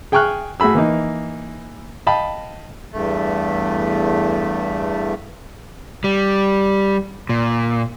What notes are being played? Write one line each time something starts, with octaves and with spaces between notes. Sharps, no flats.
G#4 G5 G#5 C#6 F6 F#6
A2 F#4 G#4 B5 E6
E3 A#3 D#4
D#5 F5 G5 A5 B5
E2 G2 A3
G3
A#2